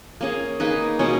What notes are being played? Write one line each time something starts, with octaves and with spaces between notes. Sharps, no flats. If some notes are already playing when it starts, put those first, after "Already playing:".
A#3 C#4 G#4
A#3 D#4 G#4 B4
B2 G#3 C#4